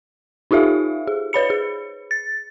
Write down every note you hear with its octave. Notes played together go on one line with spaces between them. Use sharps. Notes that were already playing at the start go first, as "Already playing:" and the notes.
D#4 F4 G4 A4 E5 F5
G#4
B4 C#5 B5 C#7
G#4
A6